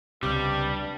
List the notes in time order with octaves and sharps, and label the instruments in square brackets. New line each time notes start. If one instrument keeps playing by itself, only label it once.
[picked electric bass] C#2 C3 [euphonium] G2 [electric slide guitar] G3 [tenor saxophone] G4